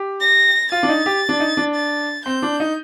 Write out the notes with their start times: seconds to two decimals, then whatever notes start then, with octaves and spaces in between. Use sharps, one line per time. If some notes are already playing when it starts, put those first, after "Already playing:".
Already playing: G4
0.21 A#6
0.72 F4 A6
0.83 D4
0.89 D#4
1.06 G4
1.29 D4
1.40 D#4
1.57 D4
1.75 A6
2.25 C4 G6
2.42 D4
2.60 D#4